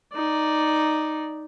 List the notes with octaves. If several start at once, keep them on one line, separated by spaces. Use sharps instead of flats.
D#4 D5